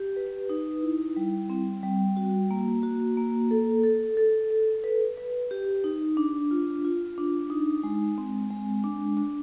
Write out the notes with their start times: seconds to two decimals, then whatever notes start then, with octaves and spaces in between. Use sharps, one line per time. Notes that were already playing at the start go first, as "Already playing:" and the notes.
Already playing: G4
0.16 B4
0.50 D#4
0.83 E4
1.17 G3
1.50 C4
1.83 G3
2.17 F#4
2.51 A#3
2.83 F#4
3.17 A#3
3.51 A4
3.83 A4
4.17 A4
4.51 A4
4.84 B4
5.17 B4
5.51 G4
5.84 D#4
6.17 D4
6.51 F4
6.84 F4
7.18 D4
7.50 D#4
7.84 G#3
8.18 C4
8.51 G#3
8.84 D4
9.17 D4